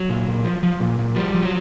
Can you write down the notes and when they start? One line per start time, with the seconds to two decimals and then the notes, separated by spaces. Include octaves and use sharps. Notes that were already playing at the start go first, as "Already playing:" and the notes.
Already playing: F#3
0.09 A#2
0.28 A#2
0.44 F3
0.63 F3
0.80 A#2
0.99 A#2
1.16 F3 G3
1.35 F3
1.43 F#3